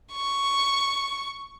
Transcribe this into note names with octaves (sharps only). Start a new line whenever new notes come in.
C#6